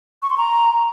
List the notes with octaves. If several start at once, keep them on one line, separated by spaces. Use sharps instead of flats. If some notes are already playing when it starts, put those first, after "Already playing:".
C#6
C6
A#5